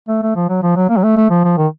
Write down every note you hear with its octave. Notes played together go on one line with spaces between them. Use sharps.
A3
A3
F3
F#3
F3
F#3
A#3
F#3
A3
A3
F3
F3
D#3